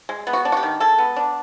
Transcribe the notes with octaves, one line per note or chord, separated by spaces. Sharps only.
G#3
B3
F#4
D4
F#4
G4
D#3
G#3 A4
B3
D4